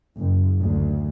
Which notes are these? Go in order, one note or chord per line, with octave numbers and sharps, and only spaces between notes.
F#1
D2